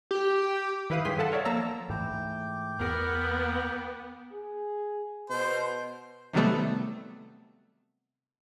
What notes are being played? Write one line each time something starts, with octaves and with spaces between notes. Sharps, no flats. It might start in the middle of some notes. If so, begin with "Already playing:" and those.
G4
D#3 E4 B4 F5 D#6
G2 C#3 G#4 G5 C6 B6
A4 F5 F#5 A5
A#4 C#5 D5 E5
F3 A#3 A5 A#5 E6
G#2 E3 A3 G5 D6
E2 B3 A#4
G#4
B2 C5
C3 D#3 F#3 G3 A3 B3